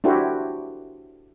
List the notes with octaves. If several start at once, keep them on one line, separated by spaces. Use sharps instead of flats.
D4 E4 F#4 G4 A4 C5